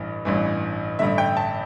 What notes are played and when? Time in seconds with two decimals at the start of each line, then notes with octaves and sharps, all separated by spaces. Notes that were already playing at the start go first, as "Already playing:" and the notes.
Already playing: A1 G2 E3
0.25 A1 G2 E3
0.99 A1 G2 D3 E5
1.18 G5
1.37 A5